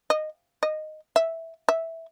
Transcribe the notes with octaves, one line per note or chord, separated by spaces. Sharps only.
D#5
D#5
E5
E5